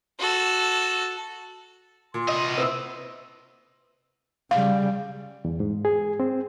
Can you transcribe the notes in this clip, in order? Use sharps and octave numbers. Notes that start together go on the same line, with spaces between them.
F#4 A4
A#2 C6
C3 D#5
C4 E4 B4 E6
C#3 G3 F5
E2
G#2
G#4
C4